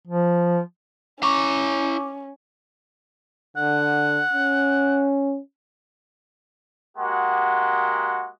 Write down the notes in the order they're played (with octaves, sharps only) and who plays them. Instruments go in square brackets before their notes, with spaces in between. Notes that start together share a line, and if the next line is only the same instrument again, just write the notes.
[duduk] F3
[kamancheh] C#4 [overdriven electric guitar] E4 A#5 [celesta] C#6 D6
[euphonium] D3 [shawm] F#5
[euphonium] C#4
[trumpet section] G#3 A#3 F#4 G4 F#5